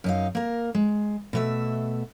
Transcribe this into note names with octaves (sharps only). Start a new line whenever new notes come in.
F#2 D#4 F5
A#3 A#4
G#3
B2 A3 E5